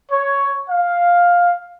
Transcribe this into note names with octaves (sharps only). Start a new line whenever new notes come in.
C#5
F5